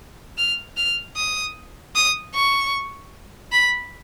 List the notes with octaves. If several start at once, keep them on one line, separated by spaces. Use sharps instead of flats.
F6
F6
D#6
D#6
C#6
B5